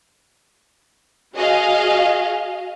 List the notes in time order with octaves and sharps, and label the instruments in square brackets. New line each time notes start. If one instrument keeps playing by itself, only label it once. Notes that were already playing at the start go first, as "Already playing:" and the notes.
[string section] F#4 G#4 D#5 F5